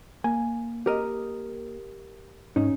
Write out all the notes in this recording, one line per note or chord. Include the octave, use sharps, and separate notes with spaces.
A#3 G#5
G4 A#4 D#5
G#2 C#4 D#4